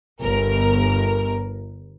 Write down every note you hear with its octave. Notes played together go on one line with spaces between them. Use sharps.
G1 A#4